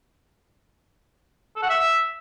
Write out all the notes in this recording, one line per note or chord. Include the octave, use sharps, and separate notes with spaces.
A4
F#5
E5